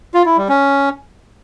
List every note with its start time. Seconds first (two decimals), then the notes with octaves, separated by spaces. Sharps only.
0.14 F4
0.26 E4
0.37 G3
0.49 C#4